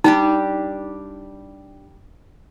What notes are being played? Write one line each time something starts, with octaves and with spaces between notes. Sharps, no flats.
G3 D4 D#4 G4